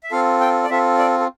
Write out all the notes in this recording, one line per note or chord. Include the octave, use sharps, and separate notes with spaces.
E5
C4 F4 A4 F5
G5
D5
C4 F4 A4 E5
D5
A4